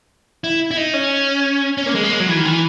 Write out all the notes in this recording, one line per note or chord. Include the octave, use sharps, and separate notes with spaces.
E4
E4
D#4
C#4
C#4
A#3
G#3
A#3
G#3
F#3
E3
D#3
E3